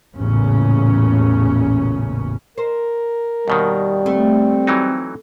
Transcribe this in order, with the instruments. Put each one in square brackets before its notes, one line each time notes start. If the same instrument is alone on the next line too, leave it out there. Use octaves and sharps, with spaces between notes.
[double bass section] A1 E2 A#2 C#3 C#4
[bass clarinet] A#4 [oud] C5
[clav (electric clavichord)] D#2 B2 D#3 [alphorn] G3
[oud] A3 [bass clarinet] C4
[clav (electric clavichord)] E3 F#3 D#4